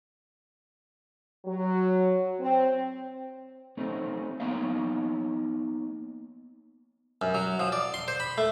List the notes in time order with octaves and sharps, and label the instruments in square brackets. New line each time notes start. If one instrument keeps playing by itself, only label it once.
[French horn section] F#3
C4
[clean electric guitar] A3 C4 C#4 D#4
A#3 B3 D#4 C#5 D#5 F5
[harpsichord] F#2
F#3
F3
D5
C6
C5
B5
A3